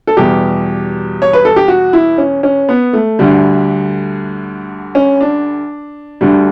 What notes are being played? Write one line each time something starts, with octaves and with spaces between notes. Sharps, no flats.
A4
E2 B2 G3 G4
C#5
B4
A4
G4
F#4
E4
C#4
C#4
B3
A3
D2 D3 G3
C#4
D4
D2 D3 G3